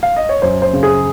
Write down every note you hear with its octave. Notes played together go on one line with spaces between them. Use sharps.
F5
D#5
C#5
F#2 C5
C5
C#3
G#4